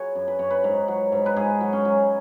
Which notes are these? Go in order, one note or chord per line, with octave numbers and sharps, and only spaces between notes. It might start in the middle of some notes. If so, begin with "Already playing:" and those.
Already playing: F#3 G#4 B4 C#5
F#2
B4
F#2 C#5
B4
G#2
F#3
G#2
B4
G#2 G#4
F#3
C#4
F#3